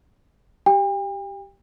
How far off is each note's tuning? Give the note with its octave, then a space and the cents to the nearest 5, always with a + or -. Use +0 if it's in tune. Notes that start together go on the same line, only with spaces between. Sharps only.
G4 -5 G5 +40